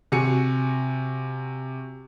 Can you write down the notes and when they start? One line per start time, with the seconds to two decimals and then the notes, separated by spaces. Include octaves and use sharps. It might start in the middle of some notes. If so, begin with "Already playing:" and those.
0.12 C3 F#4 G#5 C#7